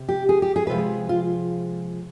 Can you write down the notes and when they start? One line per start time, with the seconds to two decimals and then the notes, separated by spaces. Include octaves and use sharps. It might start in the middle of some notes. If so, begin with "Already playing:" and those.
Already playing: C3
0.09 G4
0.29 G#4
0.42 G4
0.56 G#4
0.67 C3 F3 G#3 B4
0.78 G#4
1.09 F4